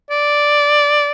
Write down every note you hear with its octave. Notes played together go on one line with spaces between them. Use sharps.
D5